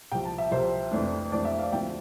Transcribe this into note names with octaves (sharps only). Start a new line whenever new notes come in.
C2 C3 F3 G5
A5
E5
C2 C3 F3 C5
F2 E3 A3 D4
F2 E3 A3 D4 D5
E5
F5
D2 D3 F3 A3 C4 G5